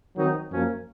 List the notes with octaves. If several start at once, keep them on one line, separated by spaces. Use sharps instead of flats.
D#3 F#3 C4 D#4
F#2 F3 A#3 C#4